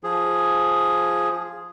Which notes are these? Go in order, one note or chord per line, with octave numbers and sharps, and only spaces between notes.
F3 G#4